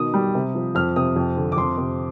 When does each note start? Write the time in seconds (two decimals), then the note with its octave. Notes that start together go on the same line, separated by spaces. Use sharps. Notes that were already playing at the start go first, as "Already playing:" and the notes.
Already playing: B2 D#3 D#6
0.14 G3
0.35 C3
0.55 F3
0.75 F2 F6
0.96 C3 D#6
1.16 F2
1.37 D3
1.52 D6
1.57 F2 C6
1.78 C3